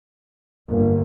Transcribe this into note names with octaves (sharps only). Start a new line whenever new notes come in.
G1 A#3